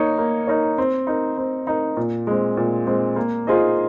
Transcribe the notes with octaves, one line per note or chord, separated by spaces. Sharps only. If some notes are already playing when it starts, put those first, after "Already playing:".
Already playing: A#3 D#4 A#4 C#5
A#3
D#4 A#4 C#5
C4
D#4 A#4
C4
D#4 A#4
A#2
G#3 C4
A#2
G#3 C4
A#3
F4 G#4 C5 D#5